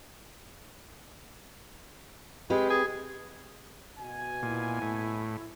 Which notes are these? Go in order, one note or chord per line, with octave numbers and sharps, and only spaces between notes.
G#3 C4 G4 B4
G#4
B2 G#5
A#2 E4
A2